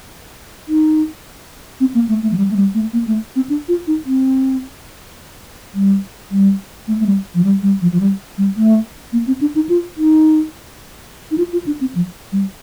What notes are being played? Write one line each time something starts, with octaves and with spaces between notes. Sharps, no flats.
D#4
C4
A#3
A3
A3
F3
G3
A3
G3
A3
A#3
A3
C4
D4
F4
D#4
C4
G3
G3
A3
A3
G3
F3
G3
G3
F3
F3
G3
G3
A3
A#3
C4
D4
D#4
F4
D#4
D#4
F4
F4
D4
C4
F3
G3